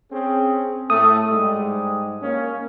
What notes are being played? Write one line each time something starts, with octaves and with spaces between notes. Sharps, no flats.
C4 C#4 G#4
A2 A3 D#6
G#2 G3 G#3
A#3 C#4